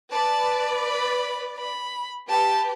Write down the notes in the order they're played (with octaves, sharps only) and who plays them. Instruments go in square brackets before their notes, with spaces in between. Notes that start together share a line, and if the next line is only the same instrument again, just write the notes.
[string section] B4 D5 [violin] A5
[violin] B5
B5
[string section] G4 B4 [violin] A5